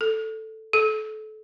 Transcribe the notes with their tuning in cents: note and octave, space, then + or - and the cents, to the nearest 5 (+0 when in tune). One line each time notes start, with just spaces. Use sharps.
A4 +0
A4 -25